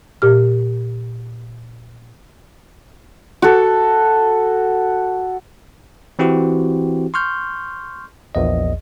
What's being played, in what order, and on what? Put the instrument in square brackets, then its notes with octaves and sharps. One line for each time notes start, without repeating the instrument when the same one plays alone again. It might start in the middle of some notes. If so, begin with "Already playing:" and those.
[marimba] A#2 G4 F6
[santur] F#4 A4
[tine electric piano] E3 C4 E4 F#4 G4
C6 C#6 F6 G6
A#1 E2 D#5